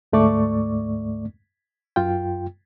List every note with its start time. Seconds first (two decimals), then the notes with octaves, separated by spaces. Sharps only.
0.13 D2 G#2 A3 D5 C#6 D6
1.96 F#2 F4 G5